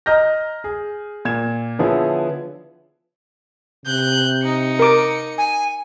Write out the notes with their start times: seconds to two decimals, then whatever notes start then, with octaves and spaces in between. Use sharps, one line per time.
0.06 D#5 A#5 F6 G6 A#6
0.64 G#4
1.25 A#2 G#6 E7
1.79 D3 F3 B3 E4 G#4 C#5
3.86 C3 F#6 G6
4.43 D#4 C#7
4.79 A#4 D6
5.38 G#5